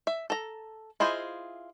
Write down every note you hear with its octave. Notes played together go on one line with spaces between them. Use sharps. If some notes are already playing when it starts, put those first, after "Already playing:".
E5
A4 A#5
E4 F4 G#4 C5 D#5